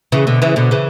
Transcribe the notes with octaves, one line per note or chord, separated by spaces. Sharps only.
C#3 E3
B2 D3
C#3 E3
B2 D3
C#3 E3